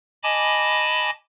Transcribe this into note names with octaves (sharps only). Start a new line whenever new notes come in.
D#5 G#5 A5 B5 D6